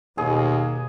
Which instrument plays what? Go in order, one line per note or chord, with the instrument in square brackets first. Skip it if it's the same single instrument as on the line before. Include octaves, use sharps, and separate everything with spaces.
[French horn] D#2 [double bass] B2 [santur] G#4 D#6